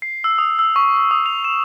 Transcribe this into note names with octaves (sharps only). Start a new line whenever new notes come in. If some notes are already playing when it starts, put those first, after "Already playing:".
C7
E6
D#6
E6
C#6
C#6
D#6
F7
E7